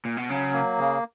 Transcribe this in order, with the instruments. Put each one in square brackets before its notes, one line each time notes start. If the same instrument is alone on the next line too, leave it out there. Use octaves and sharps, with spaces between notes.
[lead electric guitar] A#2
B2
[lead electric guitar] C#3 [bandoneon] F#3
[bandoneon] A#3
C#3